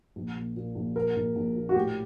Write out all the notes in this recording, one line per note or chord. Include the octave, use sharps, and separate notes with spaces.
A#1
A#2
A#2
A#1
A#2 A#4
A#1
A#1
A#2
F#4
A2 G4